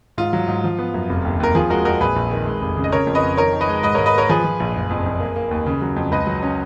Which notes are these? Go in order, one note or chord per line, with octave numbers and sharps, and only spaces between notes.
G#2 F4
F#3
G#2
F3
B3
F#2
F1
D#2
D#2 A#4
F3 F4 G#4
G#3 F#4 A#4
F2 F#4 A#4
A#1 G#4 B4
A#1
D#3
G#3
F1
C#3
D#5
C#3 A#4 C#5
F2
B4 D#5
F2
D#3 A#4 C#5
D#3
B4 D#5
G#3
G#2 B4 D#5
G#2 A#4 C#5
B4 D#5
A#3 A#4 C#5
F3 G#4 B4
F3
A#1
F#1
F2
F2
A#3
A#3
D#2
C#3
F#3
F2
C#2 B4 D#5
F#3
C#4